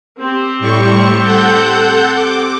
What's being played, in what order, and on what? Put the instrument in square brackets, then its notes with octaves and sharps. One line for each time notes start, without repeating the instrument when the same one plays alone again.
[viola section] C4 G4
[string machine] A2 G3 C#6
A4 F#5 G6
D6